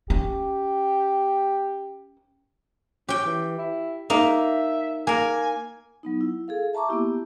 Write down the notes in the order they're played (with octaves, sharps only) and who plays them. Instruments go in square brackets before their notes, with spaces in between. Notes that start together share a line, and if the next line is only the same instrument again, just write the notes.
[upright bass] C#4 [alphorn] G4
[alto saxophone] C#4 [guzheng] G4 G5
[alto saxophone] E3
E4
[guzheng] A#3 D#4 [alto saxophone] E5
[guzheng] A#3 A#4 [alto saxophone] G#5
[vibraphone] F#3 B3 D#4
E4
G#4 A4 F5
E5 A5 A#5 C#6 D6
A#3 B3 E4 G4